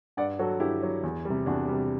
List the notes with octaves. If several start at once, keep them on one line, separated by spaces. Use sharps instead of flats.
G2 D5 F#5
F#3 F#4 A4
G2 E4 G4
F#3
E2
C3 G3
E2 D4 F#4
C3 G3